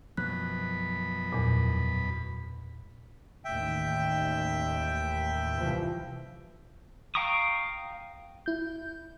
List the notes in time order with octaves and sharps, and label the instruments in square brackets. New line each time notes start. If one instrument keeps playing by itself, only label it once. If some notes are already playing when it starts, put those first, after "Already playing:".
[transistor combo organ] F#2 B2 B5 [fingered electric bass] F3 [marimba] F#6
[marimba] E2 A#2
[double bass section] A1 D#2 [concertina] E5 G5
[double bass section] C2 E3 F3
[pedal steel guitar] F5 G5 A#5 C#6 D#6
[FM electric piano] E4 G6